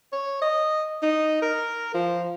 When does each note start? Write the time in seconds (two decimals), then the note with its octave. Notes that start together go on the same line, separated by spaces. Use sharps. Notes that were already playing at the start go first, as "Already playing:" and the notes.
0.13 C#5
0.42 D#5
1.03 D#4
1.42 A#4
1.94 F3